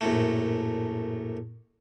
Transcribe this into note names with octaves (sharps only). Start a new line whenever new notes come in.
A#1 F#2 A2 A3